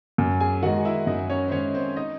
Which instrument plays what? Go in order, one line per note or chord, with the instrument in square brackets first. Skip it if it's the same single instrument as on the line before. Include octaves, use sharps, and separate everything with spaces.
[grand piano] F#2
[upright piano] G#4 G#5
[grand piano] D#3 [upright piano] F#4 F#5
[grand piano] G#3
[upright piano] E4 E5
[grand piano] F#2 [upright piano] D#4 D#5
[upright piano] C#4 C#5
C5
[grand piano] D#3 G#3 [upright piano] C#4 C#5
[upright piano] C4 C5
D#4 D#5